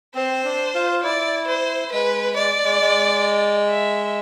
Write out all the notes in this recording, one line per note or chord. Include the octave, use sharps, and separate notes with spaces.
C4 C5
D4
F4
E4 D5
C5
G#3 B4
G#3 D5
G#3
G#3
E5